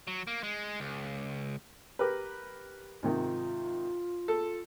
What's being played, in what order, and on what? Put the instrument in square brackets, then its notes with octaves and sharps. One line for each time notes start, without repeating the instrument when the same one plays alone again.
[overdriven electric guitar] F#3
A#3
G#3
C#2
[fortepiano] G4 A#4 B4
[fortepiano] G#2 C3 D#3 [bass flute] F4
[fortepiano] A4